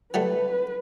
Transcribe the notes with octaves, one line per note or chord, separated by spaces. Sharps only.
F#3 G3 A3 B4